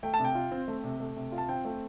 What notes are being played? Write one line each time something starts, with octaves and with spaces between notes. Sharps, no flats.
A3 G5
A5
C3
G5
F4
C4
A3
C3
A3
C3
F4
A5
C4 G5
A3